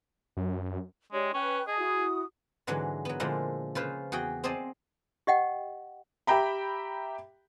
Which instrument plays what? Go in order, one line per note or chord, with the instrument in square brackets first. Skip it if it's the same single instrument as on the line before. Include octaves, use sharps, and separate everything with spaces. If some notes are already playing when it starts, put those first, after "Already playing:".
[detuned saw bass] F#2
[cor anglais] G#3 [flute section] D4 G4 C#5
[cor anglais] C#4 [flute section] B4 G5 F#6
[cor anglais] G#4 [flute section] D#5 A5 D#6
[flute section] E4 F#4 D#6
[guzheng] G#2 D3 E3 F#3 G#3
F#3 B3
A#2 D3 F3 G#3 E4
C#3 F4 B4 C5
E2 F#4 G#4 G5
C4 G#4 C5 D5 D#5 A5
[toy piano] G4 D#5 F#5 G5
[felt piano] G4 E5 G5 A#5 B5